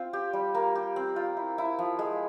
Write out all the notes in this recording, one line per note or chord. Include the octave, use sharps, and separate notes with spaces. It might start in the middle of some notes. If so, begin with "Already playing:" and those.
Already playing: C4 F4
G4
G3
A#3
G4
C4
F4
E4
E4
F3
G#3